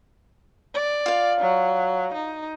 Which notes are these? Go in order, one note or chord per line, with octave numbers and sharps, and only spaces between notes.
D5
F4 F5
F#3
D#4